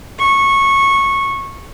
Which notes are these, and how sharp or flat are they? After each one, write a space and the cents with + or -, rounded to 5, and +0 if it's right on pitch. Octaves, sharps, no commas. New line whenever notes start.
C#6 -15